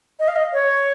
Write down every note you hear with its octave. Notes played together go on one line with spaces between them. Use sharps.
D#5
F5
D#5
C#5